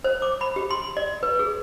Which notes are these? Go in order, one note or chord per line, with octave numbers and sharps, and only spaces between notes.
C5
D6
B5
G4
C6
D5
B4
G#4